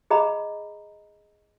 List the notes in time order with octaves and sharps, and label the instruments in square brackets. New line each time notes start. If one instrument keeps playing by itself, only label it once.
[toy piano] G#4 D#5 A#5 B5